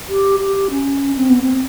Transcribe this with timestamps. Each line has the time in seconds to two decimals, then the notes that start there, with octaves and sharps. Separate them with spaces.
0.08 G4
0.39 G4
0.70 C#4
1.17 C4
1.29 B3
1.42 C4